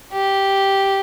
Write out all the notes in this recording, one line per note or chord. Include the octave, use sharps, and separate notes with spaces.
G4